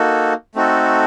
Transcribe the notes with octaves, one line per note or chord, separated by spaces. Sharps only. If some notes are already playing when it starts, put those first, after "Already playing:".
Already playing: A#3 D#4 F#4 A4
A3 C4 D#4 F#4 A4